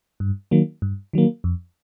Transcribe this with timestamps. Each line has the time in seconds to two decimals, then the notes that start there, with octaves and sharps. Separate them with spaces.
0.20 G2
0.51 D#3 F#3 A#3
0.82 G2
1.13 D#3 F#3 A#3
1.44 F2